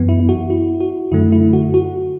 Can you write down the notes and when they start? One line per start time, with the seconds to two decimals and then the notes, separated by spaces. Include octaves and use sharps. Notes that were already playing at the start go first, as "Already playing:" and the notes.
Already playing: F#2 E3 B3
0.09 E4
0.20 E4
0.29 F#4
0.50 E4
0.80 F#4
1.12 F#2 D3 A3 E4
1.32 E4
1.53 F#4
1.74 F#4